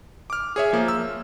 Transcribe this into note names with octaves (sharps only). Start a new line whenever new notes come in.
D6 F6
G#4 C#5 E5
F3 A#3
E6